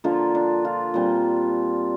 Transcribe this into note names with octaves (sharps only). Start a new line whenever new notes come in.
D3 F3 A#3 F4
D4
F4
A#2 G3 C4